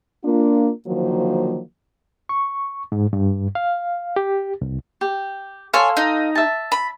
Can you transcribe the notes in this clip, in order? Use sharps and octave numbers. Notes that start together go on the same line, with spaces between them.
A#3 D4 F4
D3 D#3 F3 F#3 A#3 C5
C#6
G#2
G2
F5
G4
C2
G4
A4 C#5 F5 G#5 C6
D#4
E5 A5
B5